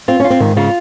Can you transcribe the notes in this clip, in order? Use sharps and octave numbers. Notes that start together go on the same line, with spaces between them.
C4 F4
C#4
F4
C4
G#2 D#3
C#3 F4